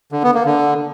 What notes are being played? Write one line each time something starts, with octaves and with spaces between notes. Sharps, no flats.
D3
B3
A#3
D3